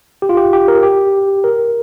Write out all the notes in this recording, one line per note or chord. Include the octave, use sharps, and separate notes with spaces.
G4
F4
G4
G4
A#4
G4
A#4